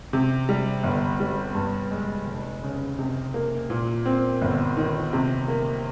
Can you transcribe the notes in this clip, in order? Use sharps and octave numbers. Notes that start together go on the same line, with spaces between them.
C3
G3
G1
G3
G2
G#3
F1
C#3
C3
A#3
A#2
C4
G1
D#3
C3
A#3